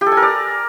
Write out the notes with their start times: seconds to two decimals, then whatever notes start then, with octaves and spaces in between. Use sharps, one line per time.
0.01 G4
0.06 A4
0.12 G#5
0.17 A#4
0.22 D5